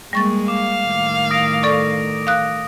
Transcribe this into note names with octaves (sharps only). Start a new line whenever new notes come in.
G3 G#3 A#3 C#6 A6
F5 D6
A2 D#3
D#6 A#6 D7
A4 D5 C#6
F5 D#6 F#6